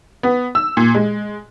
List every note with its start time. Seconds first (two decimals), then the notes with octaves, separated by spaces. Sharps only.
0.23 B3
0.55 E6
0.77 A#2
0.95 G#3